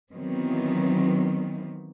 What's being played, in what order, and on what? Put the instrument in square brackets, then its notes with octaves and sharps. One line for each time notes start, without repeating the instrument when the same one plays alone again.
[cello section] D#3 E3 F#3 B3 C4